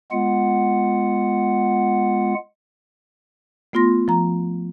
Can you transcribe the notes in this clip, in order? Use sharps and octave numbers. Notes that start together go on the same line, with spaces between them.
G#3 B3 F4 F#5
A3 B3 F4 C6 A#6
F3 A#5